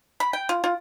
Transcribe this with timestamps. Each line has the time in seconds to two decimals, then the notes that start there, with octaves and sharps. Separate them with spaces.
0.20 B5
0.33 G5
0.49 F4
0.64 F4